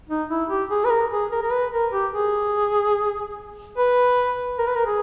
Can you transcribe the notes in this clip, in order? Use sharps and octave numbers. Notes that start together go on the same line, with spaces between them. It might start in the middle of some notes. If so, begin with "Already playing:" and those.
D#4
E4
G4
G#4
B4
A#4
G#4
A#4
A#4
B4
A#4
G4
G#4
B4
A#4
B4
A#4
G#4